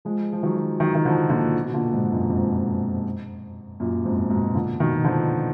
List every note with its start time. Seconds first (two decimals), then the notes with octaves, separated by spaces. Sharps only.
0.05 F3 G#3
0.33 F3
0.43 D#3 F#3
0.80 D#3 F#3
0.95 D#3
1.05 D3 F3
1.30 A#2 D3
1.65 B2
1.74 A#2 D3
1.92 G#2 B2
2.12 F#2 A#2
2.30 F2 G#2
3.80 F#2 A#2
4.05 F2 G#2
4.30 G#2 B2
4.55 A#2 D3
4.80 B2 D#3
5.04 D3 F3